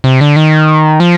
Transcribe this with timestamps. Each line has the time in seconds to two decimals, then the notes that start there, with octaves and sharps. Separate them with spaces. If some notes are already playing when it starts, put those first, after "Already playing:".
0.04 C3
0.21 D3
0.36 D#3
1.00 F3